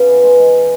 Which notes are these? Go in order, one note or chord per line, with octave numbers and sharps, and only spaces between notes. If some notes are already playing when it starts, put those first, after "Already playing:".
Already playing: C#3 B3
E3
G#3
G#3
G#3